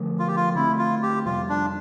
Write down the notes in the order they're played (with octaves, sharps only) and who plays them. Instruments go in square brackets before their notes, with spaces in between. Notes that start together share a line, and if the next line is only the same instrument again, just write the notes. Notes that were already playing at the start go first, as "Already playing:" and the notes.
Already playing: [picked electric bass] D3 F3 A3
[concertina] F4
G4
F4
[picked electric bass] D3 A3 C4 [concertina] E4
[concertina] F4
G4
[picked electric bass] F2 C3 G3 [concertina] F4
[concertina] D4